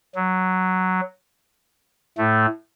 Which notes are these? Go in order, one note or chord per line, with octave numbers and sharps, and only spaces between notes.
F#3
A2 A3